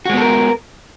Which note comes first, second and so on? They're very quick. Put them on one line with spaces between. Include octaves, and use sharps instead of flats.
F#4 G#3 B3 A4 A#4